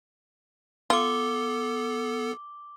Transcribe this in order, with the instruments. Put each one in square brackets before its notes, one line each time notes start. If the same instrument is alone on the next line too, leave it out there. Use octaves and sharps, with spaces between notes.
[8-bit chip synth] B3 A4 [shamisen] F4 [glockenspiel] D6 G7